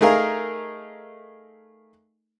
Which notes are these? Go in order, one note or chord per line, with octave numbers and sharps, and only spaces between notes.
A3 D#4 G#4 A#4 F5